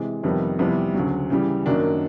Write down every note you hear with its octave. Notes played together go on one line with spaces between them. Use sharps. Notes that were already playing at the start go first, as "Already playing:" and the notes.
Already playing: C3 E3 G#3
F2 C3 D#3 G3 B3
F2 C3 E3 G3 B3
D2 C#3 F#3
C#3 E3 G3
F#2 D#3 F#3 A#3 D4